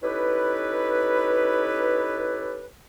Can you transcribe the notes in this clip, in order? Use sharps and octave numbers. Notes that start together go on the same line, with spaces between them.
C#4 D#4 E4 G4 A4 B4